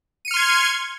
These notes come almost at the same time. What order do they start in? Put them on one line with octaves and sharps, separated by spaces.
D#7 C#7 F6 C6 G#6